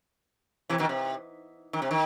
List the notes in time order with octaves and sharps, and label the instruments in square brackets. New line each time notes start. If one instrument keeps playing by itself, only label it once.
[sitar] C3 E3
B2 D#3
C3
D#3
C3
D#3